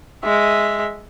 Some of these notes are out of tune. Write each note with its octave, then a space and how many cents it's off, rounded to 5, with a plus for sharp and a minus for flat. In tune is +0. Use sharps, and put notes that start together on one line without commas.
G#3 +0 E5 +0